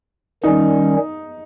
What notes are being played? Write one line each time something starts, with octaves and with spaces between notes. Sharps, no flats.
D#3 G3 C#4 D#4